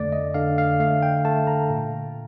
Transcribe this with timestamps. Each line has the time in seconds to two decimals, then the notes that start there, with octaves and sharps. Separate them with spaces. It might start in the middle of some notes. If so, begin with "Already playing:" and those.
Already playing: F2 D3 A3 D5
0.13 D#5
0.34 D3 F5
0.58 F5
0.80 A3 F5
1.03 G5
1.25 A3 A5
1.47 A#5
1.69 A#2